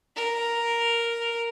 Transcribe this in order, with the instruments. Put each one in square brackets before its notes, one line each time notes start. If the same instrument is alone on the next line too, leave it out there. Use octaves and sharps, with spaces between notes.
[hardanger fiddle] A#4